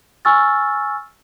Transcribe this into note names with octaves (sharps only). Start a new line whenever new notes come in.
G#5 C#6 E6 F6 A6